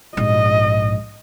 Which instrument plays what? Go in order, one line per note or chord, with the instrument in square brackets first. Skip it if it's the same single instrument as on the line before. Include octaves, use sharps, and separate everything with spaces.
[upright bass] A#1 G#2 [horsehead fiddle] D#5